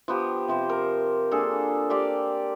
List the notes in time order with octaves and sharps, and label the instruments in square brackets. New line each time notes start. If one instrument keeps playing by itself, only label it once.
[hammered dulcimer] F3 B3 G4
C3 F3 C5
A#4
A#3 D4 G#4 A4
G4 C5 D5 F5